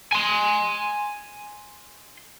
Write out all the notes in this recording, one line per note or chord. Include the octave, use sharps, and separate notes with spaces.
G#5 C6